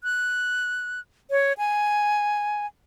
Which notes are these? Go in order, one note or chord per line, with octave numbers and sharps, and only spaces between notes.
F#6
C#5
G#5